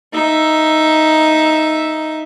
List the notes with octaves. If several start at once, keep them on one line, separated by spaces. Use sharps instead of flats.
D#4 E5